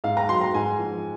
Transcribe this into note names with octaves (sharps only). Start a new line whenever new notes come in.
G#2 F5
A#5
F#3 C6
A#5
G#2 G#5
F3